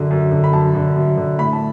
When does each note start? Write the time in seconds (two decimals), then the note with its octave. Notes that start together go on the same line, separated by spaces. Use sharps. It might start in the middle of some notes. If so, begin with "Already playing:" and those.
Already playing: F#2 D3
0.11 F#2
0.32 D3
0.44 B5
0.53 F#2 A5
0.75 D3
0.96 F#2
1.17 D3
1.38 A2 B5
1.53 A5